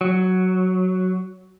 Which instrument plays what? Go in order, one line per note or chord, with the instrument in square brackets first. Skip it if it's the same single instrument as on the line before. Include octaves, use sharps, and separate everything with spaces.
[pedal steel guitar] F#3